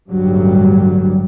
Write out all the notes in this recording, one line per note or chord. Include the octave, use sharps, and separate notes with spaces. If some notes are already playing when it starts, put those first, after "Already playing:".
A1 D2 G2 F#3 G3